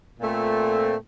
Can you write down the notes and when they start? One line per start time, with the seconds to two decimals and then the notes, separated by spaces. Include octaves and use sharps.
0.20 A#2 A3 C4